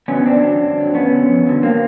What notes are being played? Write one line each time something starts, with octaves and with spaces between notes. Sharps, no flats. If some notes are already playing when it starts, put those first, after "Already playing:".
D3 F#3 B3 C#4
F#2 C4 D4
D3 F#3
F#2
D3 F#3
F#2 B3 C#4
D3 F#3
F2
D3 F#3
A#3 C4